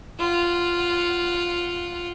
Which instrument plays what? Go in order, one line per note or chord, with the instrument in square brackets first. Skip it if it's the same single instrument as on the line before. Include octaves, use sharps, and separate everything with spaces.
[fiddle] F4 F#5